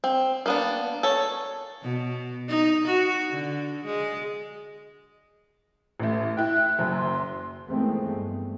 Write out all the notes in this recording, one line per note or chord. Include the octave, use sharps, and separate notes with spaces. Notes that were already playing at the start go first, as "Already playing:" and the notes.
C4
A#3 B3 D4
A4 C#5
B2
D#4
F#4
D3
G#3
A1 A3
E4 G5 F#6
F#1 F#2
C6
D#3 E3 G#3 A3 B3 C4
G2